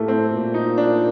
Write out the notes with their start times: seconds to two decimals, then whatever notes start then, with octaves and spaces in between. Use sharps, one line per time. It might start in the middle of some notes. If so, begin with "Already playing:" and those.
Already playing: A2 A3 A#3 G4
0.08 C4
0.31 A#2
0.54 D#4
0.78 D4